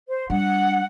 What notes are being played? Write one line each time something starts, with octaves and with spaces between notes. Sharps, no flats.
C5
G3 D4 F#5